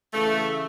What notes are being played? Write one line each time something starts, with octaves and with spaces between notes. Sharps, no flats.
C#3 E3 A3